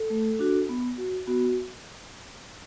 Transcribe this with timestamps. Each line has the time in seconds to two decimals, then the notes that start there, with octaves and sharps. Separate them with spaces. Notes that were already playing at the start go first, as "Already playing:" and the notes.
Already playing: A4
0.10 A3
0.39 D4 F#4
0.69 B3
0.98 F#4
1.27 B3 F#4